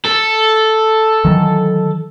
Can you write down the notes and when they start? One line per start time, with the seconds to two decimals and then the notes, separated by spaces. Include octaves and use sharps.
0.05 A4
1.25 D#3 E3 F#3